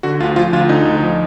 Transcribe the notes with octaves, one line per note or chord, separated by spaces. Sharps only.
D3 F#4
D2 F4
F3 F4
D2 F4
D3 D#4
D2
F3